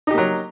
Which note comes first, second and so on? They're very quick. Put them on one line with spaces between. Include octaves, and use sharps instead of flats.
D#4 G4 A#3 F#3